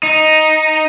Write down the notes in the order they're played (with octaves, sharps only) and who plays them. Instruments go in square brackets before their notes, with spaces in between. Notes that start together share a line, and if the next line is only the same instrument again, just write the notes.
[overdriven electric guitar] D#4